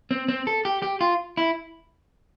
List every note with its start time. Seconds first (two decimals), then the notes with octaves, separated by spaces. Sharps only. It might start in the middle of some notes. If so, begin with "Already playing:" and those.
0.11 C4
0.28 C4
0.47 A4
0.65 G4
0.82 G4
1.01 F4
1.37 E4